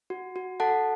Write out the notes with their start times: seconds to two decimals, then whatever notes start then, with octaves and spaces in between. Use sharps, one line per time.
0.10 F#4
0.36 F#4
0.60 A4 F#5 A5